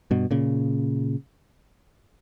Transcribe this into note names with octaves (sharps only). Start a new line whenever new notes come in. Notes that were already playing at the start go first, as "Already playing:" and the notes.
G2 B2
A#2 C#3